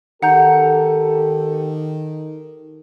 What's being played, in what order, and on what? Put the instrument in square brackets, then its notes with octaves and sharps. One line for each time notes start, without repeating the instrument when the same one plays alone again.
[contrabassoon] D#3 [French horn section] G4 A4 [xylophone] F#5 A#5 G6